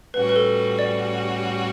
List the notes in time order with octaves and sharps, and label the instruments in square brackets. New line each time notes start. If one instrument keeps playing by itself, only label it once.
[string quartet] A2 G3 C#4 F#4 [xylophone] B4
[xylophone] B4
A4
D5